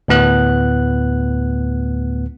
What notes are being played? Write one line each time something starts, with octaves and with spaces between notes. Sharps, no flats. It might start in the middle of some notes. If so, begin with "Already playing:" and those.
D2 A2 B3 F#6